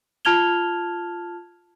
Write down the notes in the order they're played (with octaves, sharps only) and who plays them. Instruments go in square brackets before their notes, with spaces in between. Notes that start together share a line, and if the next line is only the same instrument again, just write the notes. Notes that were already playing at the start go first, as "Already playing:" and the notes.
[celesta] F4 A5 F6 G#6 F7 G7